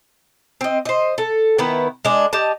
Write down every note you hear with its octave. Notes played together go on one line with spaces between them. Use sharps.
C4 D#5
C5 D#5
A4
D#3 B3 E4 B4
G#3 D4
G4 D#5 A5